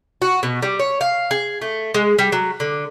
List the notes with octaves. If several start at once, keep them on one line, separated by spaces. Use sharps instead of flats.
F#4
B2
G3
C#5
F5
G#4
A3
G#3
G3
F#3
D3